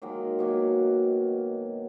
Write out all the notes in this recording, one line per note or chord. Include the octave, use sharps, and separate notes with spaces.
D#3 F#3 G#3 A#3
B2 F#3 A#3